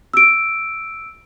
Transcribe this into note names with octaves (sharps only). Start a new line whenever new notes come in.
E6 D7